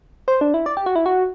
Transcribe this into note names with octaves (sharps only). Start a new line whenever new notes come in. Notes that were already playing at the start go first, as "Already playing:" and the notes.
C5
D4
E4
D5
G4
F#4
E4
F#4